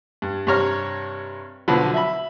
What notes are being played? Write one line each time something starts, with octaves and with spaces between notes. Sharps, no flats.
G2
G2 C3 C#5 A#5 F6
B1 D3 F3 F#3 B3 B5
E5 B5